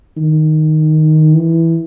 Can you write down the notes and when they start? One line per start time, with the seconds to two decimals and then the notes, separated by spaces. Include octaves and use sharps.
0.17 D#3
1.35 E3